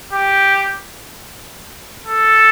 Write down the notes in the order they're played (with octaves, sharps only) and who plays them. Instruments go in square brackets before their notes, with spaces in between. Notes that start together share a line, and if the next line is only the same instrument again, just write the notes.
[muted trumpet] G4
A4